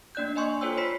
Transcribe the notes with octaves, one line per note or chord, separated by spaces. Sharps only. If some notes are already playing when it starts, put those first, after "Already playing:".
A#3 D4 D5 F#6 G6
D5 D#5 G#5 C6 C#6
F4 A4 C5 C#5 G5 E6
C5 B5 B6 C7